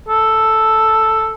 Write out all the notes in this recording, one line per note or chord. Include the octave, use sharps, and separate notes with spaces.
A4